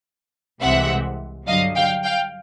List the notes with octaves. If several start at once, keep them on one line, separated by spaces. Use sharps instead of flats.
C2 C3 E3 G#3 C4 E5 F#5
G2 D3 F#3 D#5 F5
F5 G5
F5 G5